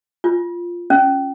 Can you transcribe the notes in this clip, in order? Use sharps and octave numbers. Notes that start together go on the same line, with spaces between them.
F4
C#4